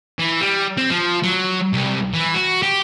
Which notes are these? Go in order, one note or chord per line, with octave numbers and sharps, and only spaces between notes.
E3
G3
C4
F3
F#3
C2
E3
F#4
G4